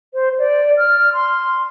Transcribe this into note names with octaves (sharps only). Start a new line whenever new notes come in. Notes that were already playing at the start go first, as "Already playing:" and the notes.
C5
D5
F6
C6